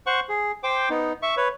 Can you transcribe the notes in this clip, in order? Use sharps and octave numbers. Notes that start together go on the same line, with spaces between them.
C5 F#5 C#6
G#4
C5 G5 D6
B3 D#4
E5 C#6
B4 C#5